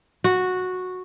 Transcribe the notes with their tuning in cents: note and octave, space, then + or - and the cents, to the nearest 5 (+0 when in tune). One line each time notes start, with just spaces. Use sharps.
F#4 -10